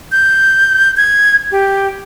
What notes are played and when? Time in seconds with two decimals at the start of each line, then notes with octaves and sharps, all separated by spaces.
0.12 G6
0.97 G#6
1.51 G4